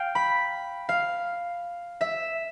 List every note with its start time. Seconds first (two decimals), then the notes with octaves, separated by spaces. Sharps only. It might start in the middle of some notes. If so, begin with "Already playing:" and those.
Already playing: F5 G5
0.15 B5
0.89 F5
2.01 E5